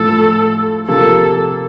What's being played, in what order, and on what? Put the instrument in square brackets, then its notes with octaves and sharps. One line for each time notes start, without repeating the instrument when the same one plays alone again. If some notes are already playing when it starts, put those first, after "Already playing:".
Already playing: [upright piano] A2 F3 A3 [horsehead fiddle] A4
[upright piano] C3 F3 A#3 [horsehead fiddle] A4